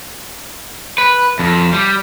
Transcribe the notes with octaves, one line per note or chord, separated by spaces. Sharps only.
B4
F2
G3